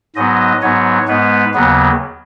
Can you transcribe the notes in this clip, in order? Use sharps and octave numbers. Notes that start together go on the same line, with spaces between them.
G#2 F#3 B3 D#5
G#2 F#3 B3 C#5
G#2 G#3 B3 B4
D#2 C#3 F#3 B3